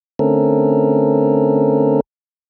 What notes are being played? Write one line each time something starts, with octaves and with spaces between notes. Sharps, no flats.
D3 A3 C4 C#4 A4 A#4